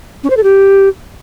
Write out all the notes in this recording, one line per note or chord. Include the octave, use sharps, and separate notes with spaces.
C#4
C5
A4
G4